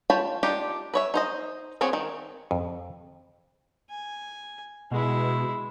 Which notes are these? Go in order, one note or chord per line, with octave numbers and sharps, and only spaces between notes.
F4 C#5 G5 A5 B5
D4 D#4 F4 G4
B4 C#5 E5
D#4 C5 D#5
B3 C4 F4 G#4 C#5
D#3
F2
G#5
B2 G#3 E4